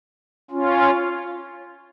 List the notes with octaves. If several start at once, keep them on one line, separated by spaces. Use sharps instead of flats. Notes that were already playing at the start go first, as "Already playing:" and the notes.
C#4 F4